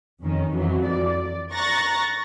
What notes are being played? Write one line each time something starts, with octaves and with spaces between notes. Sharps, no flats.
F2 D#3 C#4
F2 E3 F#3
D5
A#5 C#6 F#6 A6 A#6